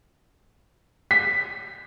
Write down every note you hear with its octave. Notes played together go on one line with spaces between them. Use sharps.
B6